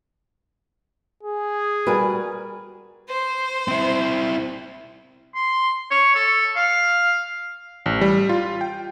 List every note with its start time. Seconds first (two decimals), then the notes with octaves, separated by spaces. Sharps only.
1.23 G#4
1.87 G3 F#4 A#4 B4 G#5
3.09 C5
3.68 C4 E4
5.35 C6
5.91 C#5
6.15 A4
6.56 F5
7.86 A1
8.01 G3
8.29 F4
8.61 G5